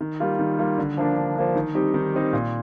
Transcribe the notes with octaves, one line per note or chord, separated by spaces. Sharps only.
D#3
G3 A#3 F4
D#3
G3 A#3 F4
D3
F3 A#3 D4
D3
F3 A#3 D4
D#3
G3 C4 D#4 G4
D#3
G3 C4 D#4 G4
A#2